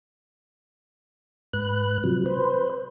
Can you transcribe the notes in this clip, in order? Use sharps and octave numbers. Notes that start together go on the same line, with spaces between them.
G#2 B4 F#6
C3 F3 F#3
B4 C5